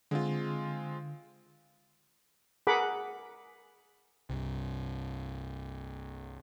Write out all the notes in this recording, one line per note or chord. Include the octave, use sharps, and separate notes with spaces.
D3 G#3 C4 F4
G#4 A#4 F#5 B5 D6
C2 G2